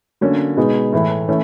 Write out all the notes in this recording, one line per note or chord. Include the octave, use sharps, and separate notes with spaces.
D3 F#3 A#3 C#4
B2 G#3 B3 D#4 G#4
A2 E3 A3
E3 A3 C#4